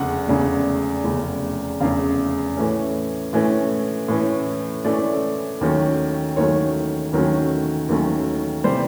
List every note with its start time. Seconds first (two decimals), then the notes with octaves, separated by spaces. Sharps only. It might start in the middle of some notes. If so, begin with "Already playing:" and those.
Already playing: F1 E2 C#3 F#5
0.28 F1 E2 C#3
1.04 F1 E2 C#3
1.80 F1 E2 C#3 F5
2.57 A2 E3 A3 C#4
3.33 A2 E3 A3 C#4
4.08 A2 E3 A3 C#4
4.84 A2 E3 A3 C#4 D5
5.61 D#2 D#3 F#3 A3 C#4
6.37 D#2 D#3 F#3 A3 C#4 C#5
7.13 D#2 D#3 F#3 A3 C#4
7.89 D#2 D#3 F#3 A3 C#4
8.64 C3 E3 G3 C5